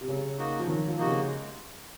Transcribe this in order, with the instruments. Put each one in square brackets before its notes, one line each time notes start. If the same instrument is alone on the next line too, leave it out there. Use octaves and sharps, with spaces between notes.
[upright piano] C3
[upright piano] C#3 [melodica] F#3
[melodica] A#3 D#4 F#4
[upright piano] F3
[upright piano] D#3 [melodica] F#3
[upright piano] F3
[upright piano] C3 [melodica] A#3 D#4 F#4
[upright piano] C#3
[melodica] G#3